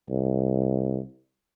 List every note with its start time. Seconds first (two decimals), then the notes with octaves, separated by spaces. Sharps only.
0.10 C2